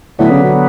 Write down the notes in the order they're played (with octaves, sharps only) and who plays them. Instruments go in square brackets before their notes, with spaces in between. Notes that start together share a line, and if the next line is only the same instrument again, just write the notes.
[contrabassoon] A2 [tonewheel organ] D3 F#3 B3
[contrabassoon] C#3
B2